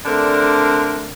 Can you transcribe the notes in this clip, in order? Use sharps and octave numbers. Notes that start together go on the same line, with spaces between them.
D3 A3 C4 D4 A#4